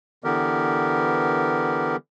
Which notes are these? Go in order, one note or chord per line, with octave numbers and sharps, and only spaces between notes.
D3 E3 B3 G4 A#4